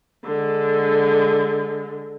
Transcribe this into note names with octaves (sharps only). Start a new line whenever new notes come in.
D3 G#3